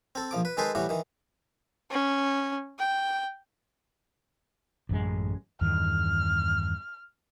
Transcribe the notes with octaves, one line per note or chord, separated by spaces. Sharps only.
C4 A4
A#1 F3 D6
B4
D#3 G#3 G#4 A4 B4 C5
A2 E3 G3 F#4
D#3 E3
C#4
G5
A1 F#2 G#3
E2 G2 D#3 F6